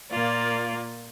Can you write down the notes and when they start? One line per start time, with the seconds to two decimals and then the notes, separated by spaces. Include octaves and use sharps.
0.12 A#2 A#3 F4 D5